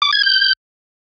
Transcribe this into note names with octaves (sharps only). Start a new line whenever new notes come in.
D6
G#6
G6